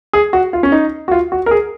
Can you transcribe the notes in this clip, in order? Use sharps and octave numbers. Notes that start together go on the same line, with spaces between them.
G#4
F#4
F4
C#4
D#4
F#4
F4
F#4
A#4
G#4